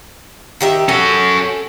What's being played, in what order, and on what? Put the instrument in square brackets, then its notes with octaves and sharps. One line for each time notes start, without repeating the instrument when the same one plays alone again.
[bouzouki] D#3 G4 E5
[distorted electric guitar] C#4 F#4 [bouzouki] A4